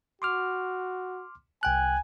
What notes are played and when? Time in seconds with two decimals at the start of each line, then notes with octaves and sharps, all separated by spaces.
0.22 F#4 C6 D6 F6
1.63 C2 G5 G#5 F#6